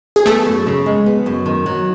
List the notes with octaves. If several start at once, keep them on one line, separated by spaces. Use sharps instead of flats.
G#4
A3 B3 A4
F#2
C#3
G#3
B3
F#2
D#3
F#3